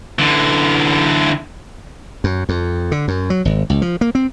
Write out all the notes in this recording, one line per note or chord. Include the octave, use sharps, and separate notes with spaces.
D3 E3
F#2
F2
D3
F#2
F#3
G#1
C#2
F3
A#3
C4